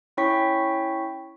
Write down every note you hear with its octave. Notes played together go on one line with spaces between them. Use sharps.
C#4 E4 C#5 G5 C#6 B6